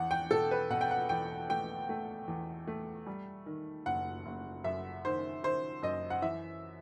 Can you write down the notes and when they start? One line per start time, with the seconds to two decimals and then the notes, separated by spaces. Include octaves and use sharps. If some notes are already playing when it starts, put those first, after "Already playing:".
Already playing: E2 F#5
0.11 G5
0.31 B2 A4
0.51 B4
0.70 B2 F#5
0.81 G5
0.91 F#5
1.09 E2 G5
1.50 A3 G5
1.89 A3
2.28 E2
2.67 A3
3.07 G3
3.46 D#3
3.86 F#1 F#5
4.26 F#1
4.64 F#2 E5
5.05 D#3 C5
5.43 D#3 C5
5.82 F#2 D#5
6.10 F#5
6.22 E3 E5